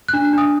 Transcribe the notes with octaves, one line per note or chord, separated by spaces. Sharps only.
D4 F#6
D4 D#6